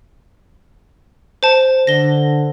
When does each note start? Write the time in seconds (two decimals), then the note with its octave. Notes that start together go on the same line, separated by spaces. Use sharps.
1.43 C5 A5
1.87 D3 A#6 G7